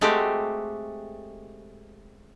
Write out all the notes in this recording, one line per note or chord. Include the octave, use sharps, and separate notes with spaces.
G#3 A3 C4 F#4 G4